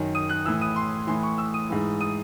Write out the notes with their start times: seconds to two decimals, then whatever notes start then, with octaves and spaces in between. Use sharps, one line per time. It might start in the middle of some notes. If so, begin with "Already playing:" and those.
Already playing: F#2 D#3
0.15 D#6
0.30 F#6
0.46 A2 E3 E6
0.61 D#6
0.76 C6
1.07 A2 E3 C6
1.23 C#6
1.38 E6
1.54 D#6
1.70 G#2 E3
2.01 D#6